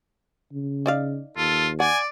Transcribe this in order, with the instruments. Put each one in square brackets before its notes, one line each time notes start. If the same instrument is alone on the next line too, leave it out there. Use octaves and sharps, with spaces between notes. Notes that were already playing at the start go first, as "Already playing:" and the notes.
[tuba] C#3
[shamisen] D#4 D5 F5
[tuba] D#2 [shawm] F4 [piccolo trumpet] A4
[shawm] D5 [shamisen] F#5 [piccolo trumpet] G#5